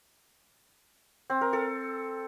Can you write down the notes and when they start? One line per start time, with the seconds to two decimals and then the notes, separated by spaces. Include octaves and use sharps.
1.30 C4
1.41 A#4
1.53 A4